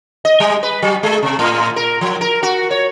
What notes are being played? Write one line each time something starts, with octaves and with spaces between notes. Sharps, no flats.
D#5
G3
B4
F#3
G#3
C3
A2
A#4
F3
A#4
F#4
C#5